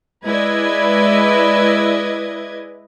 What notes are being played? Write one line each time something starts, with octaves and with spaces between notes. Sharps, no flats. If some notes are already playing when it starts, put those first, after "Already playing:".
G#3 E4 B4 D5 D#5 G#6